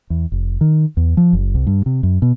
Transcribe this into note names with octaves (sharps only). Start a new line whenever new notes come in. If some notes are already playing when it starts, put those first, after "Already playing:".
E2
F1
D#3
E2
F3
F#1
C2
G2
C3
F#2
B2